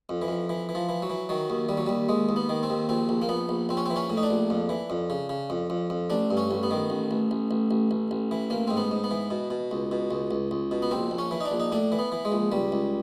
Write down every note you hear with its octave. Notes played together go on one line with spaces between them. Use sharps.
F2
E3
F2
E3
E3
F3
E3
F#3
E3
D#3 F#3
D#2
D#2 G3
F#3
D#2 G3
D#2 G#3
D#2
B3
D#3
C4
D#2
A#1 C4
A#1
A#3
A#1 B3
A#1
A#1 C4
C#4
E3 C4
C#4
A2
D#4
D4
A#1
F2
E3
F2
C#3
C#3
F2
F2
F2
A1 D4
G2
C#4
A1
B3
D#3
A1
A1
A1
A1
A1
A1
A1
E3
A1 A#3
G#2 C4
B3
G#2
B3
E3
B2
B2
C#2
B2
C#2
C#2
C#2
B2
B3
A#1 C4
A#1
C#4
E3
D#4
D4
A#1
D#4
A2 D4
E3
B3
E3
G#3
A#1
C#2 G3
C#2